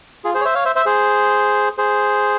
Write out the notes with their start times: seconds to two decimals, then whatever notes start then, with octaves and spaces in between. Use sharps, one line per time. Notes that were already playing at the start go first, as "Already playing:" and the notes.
0.24 F4 G#4
0.35 G#4 C5
0.41 C#5
0.45 C5 E5
0.55 C#5 F5
0.65 C5 E5
0.76 C5 E5
0.86 G#4 C5
1.78 G#4 C5